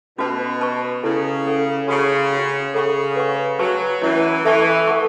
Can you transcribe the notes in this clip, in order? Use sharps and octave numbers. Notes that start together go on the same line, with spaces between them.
B2 C#4 F#4 B4 A5
B4 A5 C#6
C#3 C#4 E4 A4
C#4 A4 F#5
C#3 F#4 C#5 F#5 A5 C#6
C#4 F#4 C#5
C#3 A4 F#5 C#6
B4 F#5 C#6
F#3 B4 A5 C#6
E3 C#4 E4 C#5
E3 A4 E5 A5 C#6
A4 F#5 A5 C#6